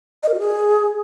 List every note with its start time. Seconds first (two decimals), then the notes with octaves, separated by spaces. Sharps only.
0.23 D#5
0.28 A#4
0.34 F#4
0.39 G#4